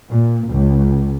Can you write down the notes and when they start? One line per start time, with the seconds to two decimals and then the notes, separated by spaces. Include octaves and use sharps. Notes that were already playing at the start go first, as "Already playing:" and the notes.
0.10 A#2
0.50 C#2